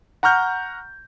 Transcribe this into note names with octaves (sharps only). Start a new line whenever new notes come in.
F#5 A#5 C#6 F6 G6